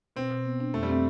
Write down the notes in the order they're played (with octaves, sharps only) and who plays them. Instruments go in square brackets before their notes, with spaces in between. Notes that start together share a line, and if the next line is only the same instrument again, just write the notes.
[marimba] B2 [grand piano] C4
[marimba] B2
B3
D4
[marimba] F2 [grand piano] A3
[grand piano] G3
[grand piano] A3 [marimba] C4